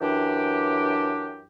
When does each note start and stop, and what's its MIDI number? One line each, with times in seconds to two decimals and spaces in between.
0.01 1.42 42
0.01 1.42 52
0.01 1.42 62
0.01 1.42 67